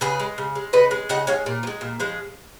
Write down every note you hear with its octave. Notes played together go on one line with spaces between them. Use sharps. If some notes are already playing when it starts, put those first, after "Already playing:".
C#3 G#4 B4
G#3
C#3
G#3
C#3 B4 D#5
G#3
C#3 D#5 F#5
G#3 C#5 F5
A#2
F3
G#3
A#2
F3 G#3